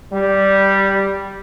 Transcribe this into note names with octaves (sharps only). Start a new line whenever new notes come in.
G3